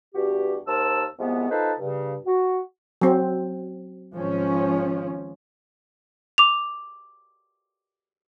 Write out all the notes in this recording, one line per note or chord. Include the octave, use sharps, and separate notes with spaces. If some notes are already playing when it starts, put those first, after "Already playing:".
E2 G2 F#4 G4
D#2 A#4 C5 A5 E6
C2 F3 G#3 B3
D#4 F4 A4 B4 C5 A5
G2 C#3
F#4
F#3 C4
G#1 F3 C#4
D6 F7